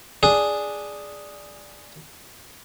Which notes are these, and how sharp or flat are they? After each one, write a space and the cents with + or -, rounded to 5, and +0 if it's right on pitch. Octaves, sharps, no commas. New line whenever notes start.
D4 +0 G#4 +0